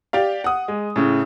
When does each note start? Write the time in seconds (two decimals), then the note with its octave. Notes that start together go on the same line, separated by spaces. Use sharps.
0.13 G4 D5 F5
0.44 F#5 D#6
0.68 G#3
0.96 A2 C#3